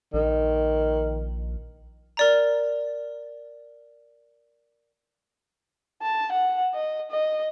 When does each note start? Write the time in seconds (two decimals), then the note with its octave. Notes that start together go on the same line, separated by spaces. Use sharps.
0.14 A#1 D#3
2.17 A#4 D5 A#5
6.02 A5
6.32 F#5
6.74 D#5
7.11 D#5